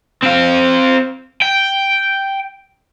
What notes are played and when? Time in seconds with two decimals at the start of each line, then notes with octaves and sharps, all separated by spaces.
0.23 C4 F5
1.42 G5